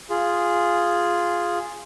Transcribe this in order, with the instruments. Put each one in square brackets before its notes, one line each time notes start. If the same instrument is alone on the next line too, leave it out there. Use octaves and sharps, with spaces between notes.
[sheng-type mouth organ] F4 G#4